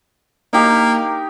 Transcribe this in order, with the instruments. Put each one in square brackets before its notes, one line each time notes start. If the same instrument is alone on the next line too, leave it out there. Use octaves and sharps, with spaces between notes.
[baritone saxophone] A#3 [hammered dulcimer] D#4 G4